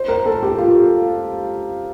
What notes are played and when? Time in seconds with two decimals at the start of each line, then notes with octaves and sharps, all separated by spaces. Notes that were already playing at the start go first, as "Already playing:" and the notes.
Already playing: C5
0.08 A#4
0.26 A4
0.43 G4
0.58 F4